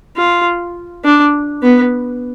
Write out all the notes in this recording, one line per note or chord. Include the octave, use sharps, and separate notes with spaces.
F4
D4
B3